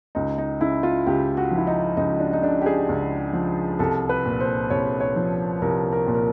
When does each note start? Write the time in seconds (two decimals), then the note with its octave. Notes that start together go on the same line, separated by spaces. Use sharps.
0.15 C#2 D#4
0.38 D#4
0.61 C#3 E4
0.83 F4
1.06 C#2 G4
1.37 F#4
1.51 F3
1.58 E4
1.67 D#4
1.97 C#2 D#4
2.20 D4
2.33 D#4
2.42 C#3 D4
2.61 G4
2.66 G#4
2.89 C#2
3.33 F3
3.79 C2 A4
4.09 B4
4.25 A#2
4.40 C5
4.70 C2 C#5
5.00 C#5
5.16 F3
5.62 C2 A#4
5.92 A#4
6.07 A#2
6.14 A#4